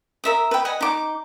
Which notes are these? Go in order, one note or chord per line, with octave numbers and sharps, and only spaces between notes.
A#4 E5 D#6
B4 G5
D#5 F#5 G#5
D#4 D6